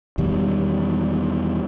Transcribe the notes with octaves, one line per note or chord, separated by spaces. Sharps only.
E2 B2 D#3 G3